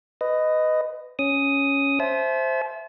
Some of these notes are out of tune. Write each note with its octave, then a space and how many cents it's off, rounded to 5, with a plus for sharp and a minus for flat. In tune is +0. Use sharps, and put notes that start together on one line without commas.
B4 +20 D#5 +0
C#4 +0 D#6 +5
C5 +5 E5 +5 A5 -40